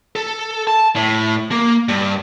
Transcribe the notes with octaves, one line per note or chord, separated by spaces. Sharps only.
A4
A5
A2
A#3
G2